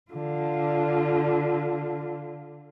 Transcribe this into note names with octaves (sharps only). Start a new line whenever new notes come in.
D3 F4